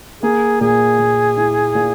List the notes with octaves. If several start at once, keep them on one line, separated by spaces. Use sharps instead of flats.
A#3 G#4
A#2 G#4
A#2
E4
A#2